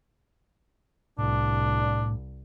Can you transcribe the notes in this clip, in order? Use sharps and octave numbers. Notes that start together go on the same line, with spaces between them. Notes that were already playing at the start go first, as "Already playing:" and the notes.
C2 A2 D4